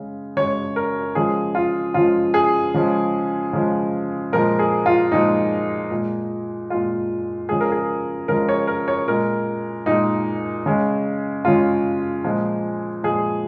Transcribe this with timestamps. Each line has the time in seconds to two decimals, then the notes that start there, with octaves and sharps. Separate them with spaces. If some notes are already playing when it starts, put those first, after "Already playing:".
Already playing: C#3 G#3
0.36 C#3 G#3 C#5
0.76 A#4
1.15 C#3 F3 G#3 G#4
1.55 F4
1.94 C#3 F3 G#3 F4
2.34 G#4
2.74 C#3 F3 G#3
3.53 C#3 F3 G#3
4.33 A#2 F3 G#3 A#4
4.59 G#4
4.86 F4
5.12 A#2 F3 G#3 D#4
5.91 A#2 G#3
6.70 A#2 G#3 F4
7.49 C#3 F3 G#3 G#4
7.61 A#4
7.72 G#4
8.28 C#3 F3 G#3 A#4
8.49 C#5
8.67 A#4
8.88 C#5
9.08 A#2 G#3 A#4
9.86 A#2 G#3 D#4
10.66 C#3 G#3
11.45 C#3 G#3 F4
12.24 A#2 F3 G#3
13.03 A#2 F3 G#3 G#4